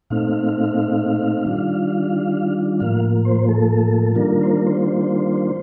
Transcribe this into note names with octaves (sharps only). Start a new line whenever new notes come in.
A#2 A3 C4 D#4 F5
D#3 G3 D4 F4
A2 F3 A#3 F5
C5
A4
D#3 G3 A#3 D4 F4 A#4
A#4
C5
A#4
C5